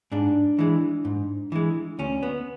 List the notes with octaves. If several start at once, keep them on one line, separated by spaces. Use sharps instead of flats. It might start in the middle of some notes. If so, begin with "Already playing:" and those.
G#2 D4
E3 G#3
G#2
E3 G#3
D2 C#4
B3